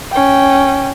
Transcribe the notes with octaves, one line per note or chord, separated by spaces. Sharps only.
C#4 G5